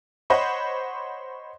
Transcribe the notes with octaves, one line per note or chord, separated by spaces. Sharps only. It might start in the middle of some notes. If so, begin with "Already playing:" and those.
C5 C#5 D#5 F#5 B5 C6